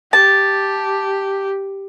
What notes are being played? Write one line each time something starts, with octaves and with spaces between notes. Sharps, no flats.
G4 A5